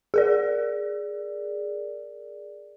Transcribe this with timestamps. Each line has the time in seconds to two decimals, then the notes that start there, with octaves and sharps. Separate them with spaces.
0.14 G#4 A#4 D5